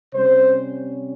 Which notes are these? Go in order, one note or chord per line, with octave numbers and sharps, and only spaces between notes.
C3 G3 C#4 C5